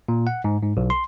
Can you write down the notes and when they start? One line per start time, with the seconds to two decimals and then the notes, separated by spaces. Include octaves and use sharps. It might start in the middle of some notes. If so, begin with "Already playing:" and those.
0.09 A#2
0.27 F#5
0.44 G#2
0.62 G#2
0.77 B1
0.90 C6